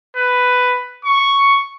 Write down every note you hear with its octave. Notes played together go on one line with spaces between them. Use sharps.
B4
C#6